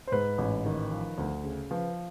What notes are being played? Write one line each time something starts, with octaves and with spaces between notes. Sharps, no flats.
C5
G#2 B4
A1
D#3
F3
D2
C#3
F3 B4